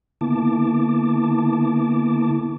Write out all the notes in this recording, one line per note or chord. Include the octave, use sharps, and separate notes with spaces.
D3 A#3 B3 E4 A5 D6